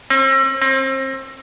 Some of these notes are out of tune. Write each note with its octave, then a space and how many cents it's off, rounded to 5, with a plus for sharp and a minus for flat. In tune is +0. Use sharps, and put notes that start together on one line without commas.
C4 +40
C4 +30